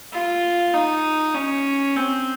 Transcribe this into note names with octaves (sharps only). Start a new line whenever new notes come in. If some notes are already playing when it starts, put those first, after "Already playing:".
F4
D#4
C#4
C4